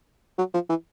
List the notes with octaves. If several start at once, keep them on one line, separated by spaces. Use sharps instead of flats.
F#3
F3
E3